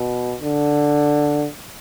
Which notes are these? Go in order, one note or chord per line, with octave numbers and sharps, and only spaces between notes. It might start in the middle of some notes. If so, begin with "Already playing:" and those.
Already playing: B2
D3